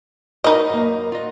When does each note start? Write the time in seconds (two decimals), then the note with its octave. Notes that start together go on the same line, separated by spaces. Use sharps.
0.44 D#4 F#4 A#4 B4 D#5
0.69 F#2 A#3
1.12 F4 F#4 D#5